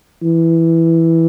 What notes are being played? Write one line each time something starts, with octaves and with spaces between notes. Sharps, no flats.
E3